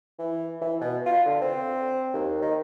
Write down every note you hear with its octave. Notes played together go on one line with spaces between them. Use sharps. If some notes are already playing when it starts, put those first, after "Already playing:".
E3
E3
B2
F4
D3
C4
D#2
D#3